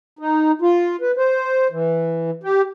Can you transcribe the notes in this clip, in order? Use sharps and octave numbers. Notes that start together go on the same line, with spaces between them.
D#4
F4
B4
C5
E3
G4